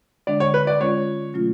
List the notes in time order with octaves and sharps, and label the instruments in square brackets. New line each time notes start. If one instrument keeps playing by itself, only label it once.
[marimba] D3 G#3 D4 [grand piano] D5
[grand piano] C#5
B4
D5
[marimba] G#3 C#4 F4 [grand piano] C#5
[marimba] B2 F#3 A3 C#4 F4